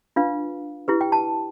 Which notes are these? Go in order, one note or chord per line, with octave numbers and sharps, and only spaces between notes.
D4 F4 B4 F5
E4 G4 B4
G5
A5